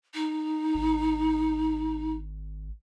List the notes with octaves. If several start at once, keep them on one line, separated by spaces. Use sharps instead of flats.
D#4
G#1